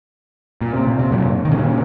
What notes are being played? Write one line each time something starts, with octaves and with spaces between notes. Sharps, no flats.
A#2
C3
A#2
C3
F#2 A#2
D#3
A#2 C#3